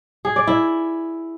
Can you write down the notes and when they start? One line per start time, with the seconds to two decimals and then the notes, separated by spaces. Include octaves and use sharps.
0.25 G#4
0.36 D5
0.47 E4